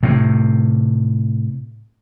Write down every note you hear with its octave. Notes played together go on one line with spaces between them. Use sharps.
A2 C3